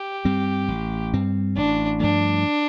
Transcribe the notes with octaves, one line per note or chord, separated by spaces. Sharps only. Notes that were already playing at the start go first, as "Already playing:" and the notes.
Already playing: G4
G2 G3 C4
A1
G2 G3 C4
A1 D4
G2 F3 A3 D4